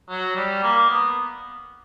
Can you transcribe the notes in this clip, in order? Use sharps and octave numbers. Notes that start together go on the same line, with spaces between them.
F#3
G3
A#3
B3